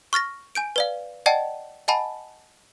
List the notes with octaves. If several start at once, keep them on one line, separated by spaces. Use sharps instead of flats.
C#6 F6 A6 A#6
G#5 G6 D7
B4 D5 F5
D5 D#5 F#5 G5 A5
D#5 F#5 G#5 A5 B5